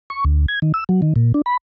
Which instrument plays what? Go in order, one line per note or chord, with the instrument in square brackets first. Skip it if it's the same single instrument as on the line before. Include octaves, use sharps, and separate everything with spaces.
[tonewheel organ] C#6
D2
G#6
D#3
E6
F#3
D#3
A#2
D4
B5